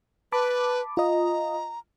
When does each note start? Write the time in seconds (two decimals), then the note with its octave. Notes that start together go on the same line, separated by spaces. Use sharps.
0.32 B4 A5 B5 D6
0.97 F4 D#5 A#5